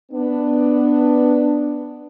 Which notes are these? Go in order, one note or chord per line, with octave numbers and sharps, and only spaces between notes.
B3 D4 B4